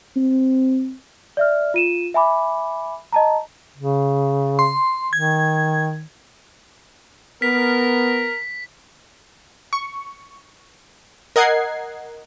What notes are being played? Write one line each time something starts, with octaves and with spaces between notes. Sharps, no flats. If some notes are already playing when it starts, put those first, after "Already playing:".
C4
D5 E5 F6
F4 D#7 E7
E5 G#5 B5 D6
D#5 A5 A#5
C#3
C6
D#3 G#6
B3 A#4 B6
C#6
A#4 D#5 F#5 G#6 C7